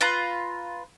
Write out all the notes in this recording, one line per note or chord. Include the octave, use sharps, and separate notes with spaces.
F4 B4 A#5